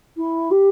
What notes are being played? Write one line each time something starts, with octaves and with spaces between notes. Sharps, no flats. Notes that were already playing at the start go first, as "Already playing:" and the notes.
E4
G4